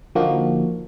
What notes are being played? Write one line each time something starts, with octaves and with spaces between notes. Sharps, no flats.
D3 F3 A#3 D#4 F#4